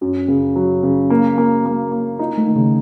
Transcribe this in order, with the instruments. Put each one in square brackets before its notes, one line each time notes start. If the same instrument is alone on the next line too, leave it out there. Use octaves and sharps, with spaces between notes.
[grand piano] F#2 [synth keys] F#4
[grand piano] C#3
F#3
C#3
A#3
A#3
A#3
A#3
[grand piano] D#4 [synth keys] F4
[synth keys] A3
[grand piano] D#3
[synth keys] C#3